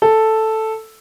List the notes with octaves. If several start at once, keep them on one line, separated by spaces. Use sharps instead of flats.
A4